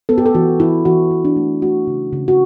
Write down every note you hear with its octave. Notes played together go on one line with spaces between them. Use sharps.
B3 A4
G4
A4
E3 F#4
E3 E4
E3 F#4
E3
D4
A3
A3 F#4
C#3
C#3
F#4